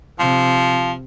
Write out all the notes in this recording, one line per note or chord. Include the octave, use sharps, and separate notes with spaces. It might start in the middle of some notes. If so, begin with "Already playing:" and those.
C3 F3